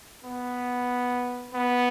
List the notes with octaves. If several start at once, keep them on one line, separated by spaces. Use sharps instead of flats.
B3
B3